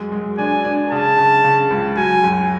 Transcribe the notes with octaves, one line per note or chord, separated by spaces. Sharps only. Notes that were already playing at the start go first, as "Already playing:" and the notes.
Already playing: F#2 G#3
G#3
D4 G#5
D4
C#3 A5
C#3
C#3
C#2
F#3 G#5
F#2